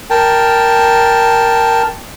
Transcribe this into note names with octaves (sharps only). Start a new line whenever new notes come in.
A#4 G5 A5